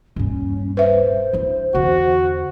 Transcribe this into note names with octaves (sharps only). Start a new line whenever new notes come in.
D#1 G2 C#4
B4 C5 E5
D4 E4
E2 D3 F#4